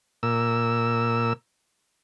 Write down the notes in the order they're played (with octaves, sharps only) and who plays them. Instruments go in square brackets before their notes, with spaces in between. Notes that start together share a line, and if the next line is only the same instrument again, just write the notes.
[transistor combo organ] A#2 E6